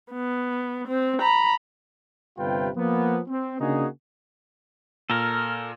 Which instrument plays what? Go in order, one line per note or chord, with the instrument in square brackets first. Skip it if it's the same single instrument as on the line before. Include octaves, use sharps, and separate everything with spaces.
[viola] B3
C4
A#5 B5
[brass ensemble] G1 C3 G3 F4 B4 G5
F3 A#3 B3
C4
C#3 A#3 D4 D#4 F#4 G#4
[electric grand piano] A#2 [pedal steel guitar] A4 A#4 [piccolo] F6